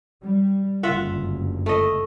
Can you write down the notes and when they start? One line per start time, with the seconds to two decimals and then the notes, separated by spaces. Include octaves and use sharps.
0.22 G3
0.83 F#1 D2 G2 F4 E5 F#5
1.66 A3 D#5